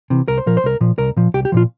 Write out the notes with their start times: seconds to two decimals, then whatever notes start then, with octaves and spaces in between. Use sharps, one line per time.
0.10 C3 E3
0.28 C2 A#4
0.38 C5
0.46 A#2 F3 A#4
0.57 C5
0.64 C2 A#4
0.81 A#2 F3
0.98 C2 A#4
1.17 A#2 F3
1.34 C2 G4
1.45 G4
1.52 A#2 F3 F4